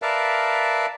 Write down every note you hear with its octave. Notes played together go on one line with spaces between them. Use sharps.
A#4 B4 D5 E5 F5 A5